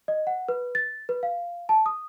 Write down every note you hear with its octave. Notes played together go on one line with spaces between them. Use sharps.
D#5
F#5
B4
A6
B4
F5
A5
D#6